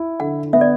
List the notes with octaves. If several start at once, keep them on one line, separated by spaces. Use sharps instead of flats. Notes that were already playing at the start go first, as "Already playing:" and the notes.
Already playing: E4
D3 F#5
B3 E5
D5